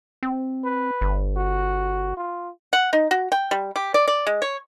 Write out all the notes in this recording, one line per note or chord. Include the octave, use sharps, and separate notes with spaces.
C4
B4
G1
F#4
F4
F#5
D#4
F#4
G5
G3
G4
D5
D5
G#3
C#5